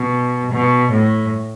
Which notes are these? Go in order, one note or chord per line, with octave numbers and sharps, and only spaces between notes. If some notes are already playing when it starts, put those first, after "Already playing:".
Already playing: B2
B2
A2